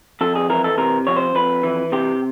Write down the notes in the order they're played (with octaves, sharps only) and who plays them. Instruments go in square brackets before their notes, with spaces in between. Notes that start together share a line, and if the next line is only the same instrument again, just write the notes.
[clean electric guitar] F2 A4
G#4
E3 A#4
A4
C3 A#4
F2 C#5
C5
F2 B4
E3
C3 G4